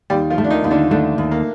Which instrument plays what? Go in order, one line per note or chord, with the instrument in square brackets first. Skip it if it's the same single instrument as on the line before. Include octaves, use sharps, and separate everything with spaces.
[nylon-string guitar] D#2 [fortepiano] G3 G4
[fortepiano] F3 F4
[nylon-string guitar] A3
[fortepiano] D4
D#3 D#4
[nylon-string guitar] D#2
[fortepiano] D3 D4
[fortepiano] D3 D4 [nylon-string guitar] A3
[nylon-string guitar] D#2
[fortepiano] A#3